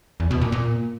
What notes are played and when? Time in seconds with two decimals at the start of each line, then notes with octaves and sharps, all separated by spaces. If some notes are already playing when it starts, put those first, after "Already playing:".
0.20 E2
0.31 B2
0.41 A#2
0.52 A#2